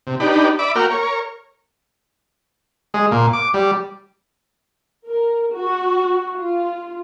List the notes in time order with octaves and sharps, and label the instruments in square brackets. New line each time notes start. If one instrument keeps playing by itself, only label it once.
[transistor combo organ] C3
D4 D#4 G4 B4
D5 E5 B5 D6
A#3 F#4 A#4 G5 F6
A#4 C#5
G#3
A#2
D6
G3
[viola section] A#4
F#4
F4